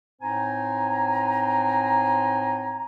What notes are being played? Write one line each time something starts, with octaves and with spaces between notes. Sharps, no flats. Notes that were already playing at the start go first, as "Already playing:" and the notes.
A2 C4 D#4 C5 G#5 A#5